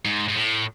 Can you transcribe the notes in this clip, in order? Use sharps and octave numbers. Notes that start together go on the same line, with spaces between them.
G#2
G#2
A2